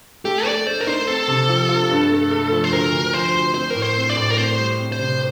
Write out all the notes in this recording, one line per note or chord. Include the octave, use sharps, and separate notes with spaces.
A3 G4
A3 D5
A3 C5
A#4
D#4 C5
C4 A4
C3
F3
F4
G2
A3
A3
F3
C5
D2 A#4
D2
F3 C5
D2
C4 C5
A2 A#4
C5
C4
D5
A2
A#4
C4 C5
G3
C4
C5
C3